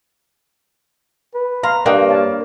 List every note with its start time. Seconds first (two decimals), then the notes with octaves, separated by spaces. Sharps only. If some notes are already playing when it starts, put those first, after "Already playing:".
1.34 B4
1.63 F5 A#5 C6
1.86 G2 A#3 D4 D#5 F#5 G5
2.09 C#5 F5 A5